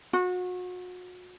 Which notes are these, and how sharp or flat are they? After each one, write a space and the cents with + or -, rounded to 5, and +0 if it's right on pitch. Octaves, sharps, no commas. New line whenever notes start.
F#4 -35